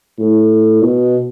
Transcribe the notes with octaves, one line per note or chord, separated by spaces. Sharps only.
A2
B2